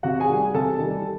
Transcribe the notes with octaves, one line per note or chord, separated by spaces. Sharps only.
C3 F#4 F#5
G#4 G#5
D#3 G3
C3 A4 A5
D#3 G3